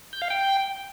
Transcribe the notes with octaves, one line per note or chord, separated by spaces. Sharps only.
G6
F5
G5